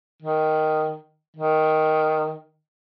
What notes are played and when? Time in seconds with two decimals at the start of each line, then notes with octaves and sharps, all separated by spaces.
0.22 D#3
1.36 D#3